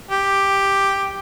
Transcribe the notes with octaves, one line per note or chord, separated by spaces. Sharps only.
G4